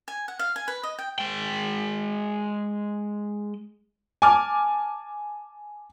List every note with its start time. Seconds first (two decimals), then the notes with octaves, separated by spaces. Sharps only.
0.08 G#5
0.28 F#5
0.39 F5
0.56 G#5
0.68 B4
0.83 D#5
0.99 G5
1.19 G#3 G5
4.22 G#5 A5 D6 F6